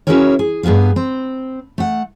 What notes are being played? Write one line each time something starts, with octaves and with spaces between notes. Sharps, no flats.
C#4 E4 F#4 G#4 A#4 C#5
G#4
G2 B3 G#4 B4 F5
C4
A3 F#5